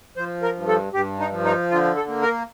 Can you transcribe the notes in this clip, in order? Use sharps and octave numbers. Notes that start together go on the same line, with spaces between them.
F3 C5
A#4
G2
A4
G2 G4
D#4
F3
D#4
D3 F4
A4
A#3
A#4